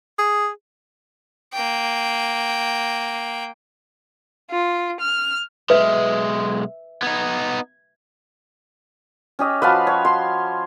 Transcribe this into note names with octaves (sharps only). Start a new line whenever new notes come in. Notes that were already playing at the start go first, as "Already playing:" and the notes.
G#4
A#3 G5
F4
F6
B1 G#3 B4 E5
B3 D#4 G#6
C#4 G4 D#5
F3 F#4 B4 F5 A5 B5
C#5
C6